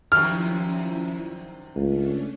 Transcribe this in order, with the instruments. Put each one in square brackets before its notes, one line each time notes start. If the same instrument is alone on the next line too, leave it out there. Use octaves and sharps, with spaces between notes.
[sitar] F#2 C3 D#3 [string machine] F3 C#4 E4 [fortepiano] F6
[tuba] C#2 [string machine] A3 C#4 D4